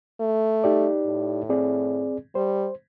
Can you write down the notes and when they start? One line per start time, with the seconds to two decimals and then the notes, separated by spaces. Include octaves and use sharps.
0.20 A3
0.64 D#4 G4 D5
1.07 A2
1.49 C4 G#4 D5
2.35 G3 C5